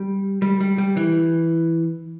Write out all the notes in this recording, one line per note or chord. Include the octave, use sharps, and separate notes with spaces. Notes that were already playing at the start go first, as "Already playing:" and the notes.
Already playing: G3
G3
G3
G3
E3